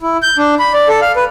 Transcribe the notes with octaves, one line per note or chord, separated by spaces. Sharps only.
E4
G6
D4
B5
D5
A4
F5
B4